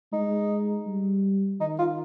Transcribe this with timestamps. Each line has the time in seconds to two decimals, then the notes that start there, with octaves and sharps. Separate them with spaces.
0.13 G#3 D#4
0.87 G3
1.61 D#3 D#4
1.79 F4